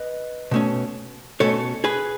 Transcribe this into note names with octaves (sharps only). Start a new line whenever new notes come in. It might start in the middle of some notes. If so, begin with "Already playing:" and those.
Already playing: B4 D#5
B2 A3 C#4
B2 A3 C#4 A4 C#5
G#4 B4